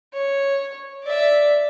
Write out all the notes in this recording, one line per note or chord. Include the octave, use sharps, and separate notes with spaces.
C#5
D5 E5